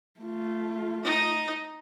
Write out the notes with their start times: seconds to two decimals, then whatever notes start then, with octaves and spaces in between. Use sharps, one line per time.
0.21 A3 F4
1.04 D#4 D#5